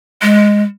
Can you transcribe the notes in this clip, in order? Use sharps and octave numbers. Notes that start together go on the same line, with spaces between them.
G#3